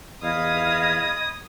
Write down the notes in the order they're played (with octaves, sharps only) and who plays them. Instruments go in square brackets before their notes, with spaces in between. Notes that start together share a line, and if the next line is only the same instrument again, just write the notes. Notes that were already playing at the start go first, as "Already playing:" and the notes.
[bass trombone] E2 [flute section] D#5 B5 G#6 [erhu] F5 [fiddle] D#6